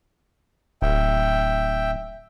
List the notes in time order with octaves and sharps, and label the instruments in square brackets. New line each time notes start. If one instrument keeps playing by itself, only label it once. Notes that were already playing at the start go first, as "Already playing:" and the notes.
[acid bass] D1 [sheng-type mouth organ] E5 G5